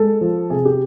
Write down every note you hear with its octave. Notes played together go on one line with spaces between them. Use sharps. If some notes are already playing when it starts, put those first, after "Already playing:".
Already playing: G#3 A4
F3
C3 G#4
G4